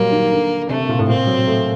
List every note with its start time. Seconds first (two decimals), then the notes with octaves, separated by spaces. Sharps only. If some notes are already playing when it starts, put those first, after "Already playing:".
Already playing: A#2 F#3 G3 A#3
0.12 D#3
0.32 D3
0.69 C3 A3
0.80 C3
0.89 A#2
0.99 A2
1.08 A#2 C4
1.27 F#3
1.47 A3